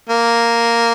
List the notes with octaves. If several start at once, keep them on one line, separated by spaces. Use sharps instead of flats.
A#3